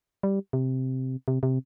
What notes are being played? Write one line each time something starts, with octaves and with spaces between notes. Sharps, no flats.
G3
C3
C3
C3